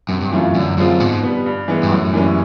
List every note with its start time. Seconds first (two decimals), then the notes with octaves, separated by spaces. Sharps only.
0.09 F#2 C3
0.21 G2
0.32 F#2 E3 A3 C#4 F4
0.54 F#2 D3
0.77 F#2 F3 G#3 C4 F4
1.00 G#2 B2
1.23 G3 B3
1.46 G2
1.68 E3 G#3 B3
1.83 G2
1.91 F#2 A2
2.13 E3 G3 A#3 C#4